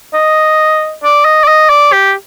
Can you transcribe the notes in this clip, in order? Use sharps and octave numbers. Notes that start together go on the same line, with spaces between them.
D#5
D5
D#5
D5
D#5
D5
G4